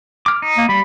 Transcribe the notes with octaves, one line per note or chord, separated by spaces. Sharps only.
D6 F6
D#4
A#3
G3 B5